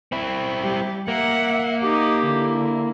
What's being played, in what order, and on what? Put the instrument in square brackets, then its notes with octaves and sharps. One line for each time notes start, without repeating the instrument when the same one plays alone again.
[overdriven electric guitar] C4 E4
[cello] G3 G4
[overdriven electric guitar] A#3 [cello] E5 F#5
[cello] D#4 [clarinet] G4
[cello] D3 E4